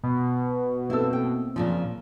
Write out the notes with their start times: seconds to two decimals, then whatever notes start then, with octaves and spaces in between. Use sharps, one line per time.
0.03 B2
0.90 A#3 C4 E4 A4 E6
1.13 G5
1.56 A#2 C#3 F3